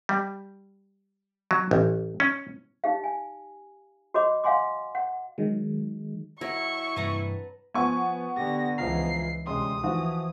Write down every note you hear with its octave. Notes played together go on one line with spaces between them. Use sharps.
G3
F#3
A1
C#4
D#4 G4 F5
G#5
F#4 C#5 D#5 B5 D6
F5 F#5 G#5 C6 D6
F#5
D#3 F#3 G#3
F#3 E4 A#4 C#5 C#6
G2 C3 E3 B4 A5 A#5
F3 B3 G#5 C#6
D3 G4 A#6
C#2 E3 F3 F5 A#5 C7
D2 C3 G#3 C#4 C6 D#6
E3 F3 F#4